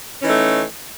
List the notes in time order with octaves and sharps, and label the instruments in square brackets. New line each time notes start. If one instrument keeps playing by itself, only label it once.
[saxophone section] C#4
E3
D#4
A3